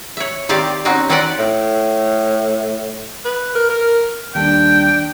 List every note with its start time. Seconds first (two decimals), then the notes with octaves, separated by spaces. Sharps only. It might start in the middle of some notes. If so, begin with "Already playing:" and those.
0.17 C#5 E5
0.49 D#3 C4 G4 D5 F5
0.85 C4 C#4 D#4 F#4
1.09 C4 C#4 A#4 B4 D5 F#5
1.39 A2
3.25 B4
3.55 A#4
3.69 A#4
4.35 D#2 G3 D4 A4 G5